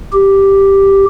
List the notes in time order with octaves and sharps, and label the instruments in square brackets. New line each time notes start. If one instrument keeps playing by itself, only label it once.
[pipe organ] G4